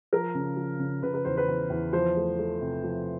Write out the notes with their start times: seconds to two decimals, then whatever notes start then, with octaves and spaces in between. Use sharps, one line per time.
0.13 F3 A#4
0.35 C#3
0.57 F3
0.79 C#3
1.03 C#3 B4
1.14 B4
1.25 E2 C5
1.37 B4
1.48 E2
1.70 E2
1.93 F3 C5
2.16 A3
2.39 A3
2.61 C3
2.84 F3